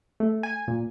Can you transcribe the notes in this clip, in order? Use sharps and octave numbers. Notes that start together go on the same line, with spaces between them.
A3
G#5
A#2